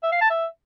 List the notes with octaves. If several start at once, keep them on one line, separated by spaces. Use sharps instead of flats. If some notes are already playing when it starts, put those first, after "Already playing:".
E5
F5
A5
E5